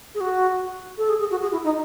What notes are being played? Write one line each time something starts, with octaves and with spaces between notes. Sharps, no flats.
G#4
F#4
A4
G#4
G#4
F#4
G#4
E4
D#4